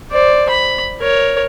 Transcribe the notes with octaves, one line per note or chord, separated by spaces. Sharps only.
C5 D5
B5
A#4 C#5